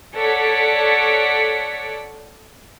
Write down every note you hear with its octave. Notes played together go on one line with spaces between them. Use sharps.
A4 C#5 D5 F#5 B6 C#7